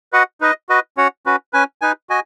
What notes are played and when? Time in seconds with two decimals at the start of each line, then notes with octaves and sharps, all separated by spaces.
0.13 F#4 B4 D#5 F#5
0.41 D#4 B4 D#5
0.69 F#4 B4 D#5
0.97 C#4 F#4 C#5 F#5
1.26 C#4 F#4 B4
1.53 C#4 B4 G#5
1.81 D#4 B4 G#5
2.09 F#4 D#5 G#5